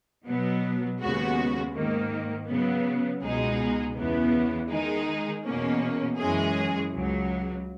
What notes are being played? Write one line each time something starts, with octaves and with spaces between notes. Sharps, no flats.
B2 F#3 B3
D#2 C#3 G#3 B3 F#4
G#2 D#3 A#3
C#3 F#3 B3
C#2 B2 G#3 D#4 G#4
E2 C#3 E3 B3
D#3 G#3 D#4 G#4
E2 B2 A#3 C#4
F#2 E3 G#3 C#4 G#4
C#2 C#3 F#3